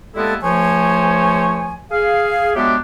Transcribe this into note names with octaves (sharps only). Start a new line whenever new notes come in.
G3 G#3 A#3 B3 E4 A4
C#2 F3 A3 C5 C#5 G#5
G#4 F5
F#3 G#3 B3 D4 G4 E5